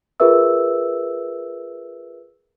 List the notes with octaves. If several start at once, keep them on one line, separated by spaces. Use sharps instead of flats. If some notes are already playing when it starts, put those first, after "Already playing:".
F4 G#4 A#4 B4 E5 E6